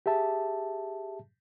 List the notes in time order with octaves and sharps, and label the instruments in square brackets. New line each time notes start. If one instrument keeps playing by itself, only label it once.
[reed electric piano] G4 G#4 E5 A5